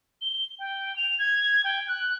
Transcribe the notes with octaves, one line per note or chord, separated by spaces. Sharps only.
G7
G5
F7
G#6
G5
F#6